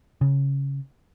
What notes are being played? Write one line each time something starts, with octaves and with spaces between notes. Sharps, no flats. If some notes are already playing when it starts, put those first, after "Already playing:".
C#3